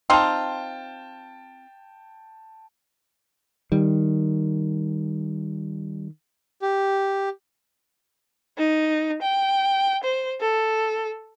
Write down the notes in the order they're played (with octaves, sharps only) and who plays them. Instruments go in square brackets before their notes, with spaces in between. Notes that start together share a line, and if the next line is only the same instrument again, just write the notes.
[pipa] C4 D#4 F4 [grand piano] G5 A5
[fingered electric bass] D#3 [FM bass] G3
[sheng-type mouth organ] G4
[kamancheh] D#4
G5
C5
A4